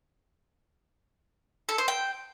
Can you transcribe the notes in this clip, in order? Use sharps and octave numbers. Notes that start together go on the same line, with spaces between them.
A4
C5
G5